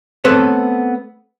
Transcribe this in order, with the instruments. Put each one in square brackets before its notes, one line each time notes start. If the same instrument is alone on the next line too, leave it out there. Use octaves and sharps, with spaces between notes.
[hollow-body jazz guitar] A3 B3 C4 A4 B4 C#5